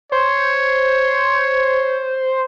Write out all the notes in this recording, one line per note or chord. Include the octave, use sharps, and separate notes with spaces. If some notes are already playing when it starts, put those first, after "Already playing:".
C5 C#5